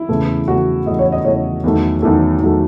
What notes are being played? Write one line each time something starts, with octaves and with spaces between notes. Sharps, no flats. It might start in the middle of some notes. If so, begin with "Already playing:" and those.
Already playing: E4
E2 C#3 E3 A3
E2 C#3 E3 A3 F#4
E2 C#3 E3 A3 D#5
C#5
D#5
E2 C#3 E3 A3 C#5
E2 D#3 F#3 A3
E2 D#3 F#3 A3
E2 D#3 F#3 A3